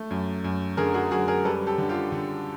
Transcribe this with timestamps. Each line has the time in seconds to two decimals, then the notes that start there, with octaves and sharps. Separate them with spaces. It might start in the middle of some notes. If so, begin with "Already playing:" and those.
Already playing: A3
0.11 F#2
0.44 F#2
0.77 D3 G#4 A#4
0.94 F#4 G#4
1.11 F#2 F#4 G#4
1.28 G#4 A#4
1.45 G3 A4 B4
1.67 G4 A4
1.78 D3
1.89 F4 G4
2.12 D3